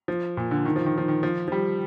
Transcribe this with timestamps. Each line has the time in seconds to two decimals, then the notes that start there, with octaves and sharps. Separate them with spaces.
0.08 F3
0.37 A#2
0.51 D3
0.65 D#3
0.76 F3
0.86 D#3
0.98 F3
1.08 D#3
1.23 F3
1.48 F3
1.52 G3